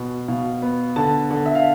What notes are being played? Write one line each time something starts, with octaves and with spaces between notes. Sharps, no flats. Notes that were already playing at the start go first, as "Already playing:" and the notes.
Already playing: B2 B3
B2 F5
B3
D3 A5
D3
E5
F5